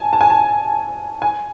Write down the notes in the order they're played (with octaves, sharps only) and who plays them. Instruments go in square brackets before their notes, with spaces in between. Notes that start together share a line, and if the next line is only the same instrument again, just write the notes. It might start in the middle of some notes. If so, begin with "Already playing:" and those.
Already playing: [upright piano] G#5 A5
A5
G#5
A5
G#5